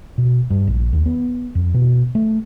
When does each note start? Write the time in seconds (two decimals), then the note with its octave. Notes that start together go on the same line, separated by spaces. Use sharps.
0.18 B2
0.50 G2
0.67 A#1
0.93 D#2
1.06 B3
1.55 F2
1.74 B2
2.15 A3